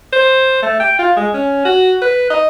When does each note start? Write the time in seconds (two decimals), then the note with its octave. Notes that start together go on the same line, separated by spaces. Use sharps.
0.13 C5
0.62 A3
0.80 G5
0.99 F4
1.17 G#3
1.34 C#4
1.65 F#4
2.02 B4
2.30 D#5